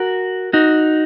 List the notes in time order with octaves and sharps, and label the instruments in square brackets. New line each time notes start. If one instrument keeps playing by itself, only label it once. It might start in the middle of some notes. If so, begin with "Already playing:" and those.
Already playing: [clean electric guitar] F#4 A#4
D#4 F#4